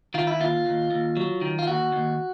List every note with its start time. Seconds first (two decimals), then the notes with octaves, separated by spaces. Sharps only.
0.14 D#3 F4
0.27 E4
0.40 D#2 F4
0.66 D#2
0.91 D#2
1.17 F#3
1.41 D#3
1.59 F4
1.67 D#2 F#4
1.92 D#2